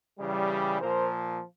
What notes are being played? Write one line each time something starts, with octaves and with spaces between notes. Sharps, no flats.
C#3 E3 G3
A#2 F3 A#4 C5